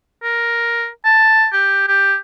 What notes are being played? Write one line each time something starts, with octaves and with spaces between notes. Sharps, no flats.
A#4
A5
G4
G4